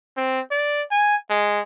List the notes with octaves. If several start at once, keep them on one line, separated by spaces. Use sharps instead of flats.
C4
D5
G#5
G#3